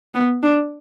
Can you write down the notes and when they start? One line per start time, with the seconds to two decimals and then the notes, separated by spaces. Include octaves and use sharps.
0.14 B3
0.43 D4